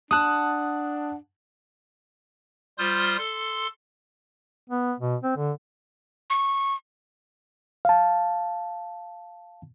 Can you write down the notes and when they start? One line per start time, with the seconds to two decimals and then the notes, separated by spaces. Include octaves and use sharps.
0.11 D4 F#5 A5 D#6 F#6
2.78 G3 F4 C5 C6 D#6 F6
3.18 A4 C6
4.70 B3
5.00 B2
5.23 C4
5.37 D3
6.30 C#6
7.85 F5 A5